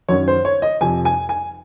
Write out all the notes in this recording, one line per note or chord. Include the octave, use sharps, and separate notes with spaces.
F#2 D#3 F#3 C#4 C#5
C5
C#5
D#5
F2 C3 F3 G#5
G#5
G#5